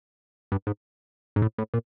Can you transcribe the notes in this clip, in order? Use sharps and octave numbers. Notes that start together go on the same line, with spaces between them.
G2
G#2
G#2
A2
A2
A#2